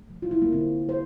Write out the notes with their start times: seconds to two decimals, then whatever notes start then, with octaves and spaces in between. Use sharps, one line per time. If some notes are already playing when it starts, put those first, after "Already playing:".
Already playing: A3
0.10 F3
0.22 F4
0.31 E4
0.42 A#3
0.52 D3 C4
0.89 C5